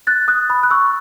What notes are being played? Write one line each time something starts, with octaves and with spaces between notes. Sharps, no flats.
F#6 A6
D#6 F#6
B5 D#6
F#6
C#6 E6